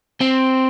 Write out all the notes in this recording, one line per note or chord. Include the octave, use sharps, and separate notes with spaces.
C4